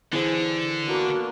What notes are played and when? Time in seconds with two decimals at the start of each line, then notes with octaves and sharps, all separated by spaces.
0.13 D3 E3 G#4 C5
0.88 A#3 B3 D4 F#4